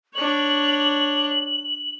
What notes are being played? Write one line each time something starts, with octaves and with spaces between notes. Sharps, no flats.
D4 C#5 F#7